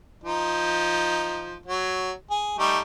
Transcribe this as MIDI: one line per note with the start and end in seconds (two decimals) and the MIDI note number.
0.24 1.57 53
0.24 1.57 63
1.66 2.11 54
2.30 2.57 68
2.59 2.80 55
2.59 2.80 57
2.59 2.80 63